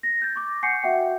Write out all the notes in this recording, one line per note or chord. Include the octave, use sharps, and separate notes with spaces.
A#6
G6 A6
C#6 D6
F#5 G#5 C#6 G6 C7 C#7
F#4 E5 F#5 G5